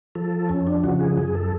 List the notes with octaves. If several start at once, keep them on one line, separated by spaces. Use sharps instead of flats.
F3 A4
F2 C#4
D4
C#3 F3 F#4
G#4
F#2 G#4
A4